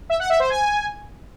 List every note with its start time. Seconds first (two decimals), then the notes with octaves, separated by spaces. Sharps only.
0.10 E5
0.20 F#5
0.30 E5
0.40 C5
0.50 G#5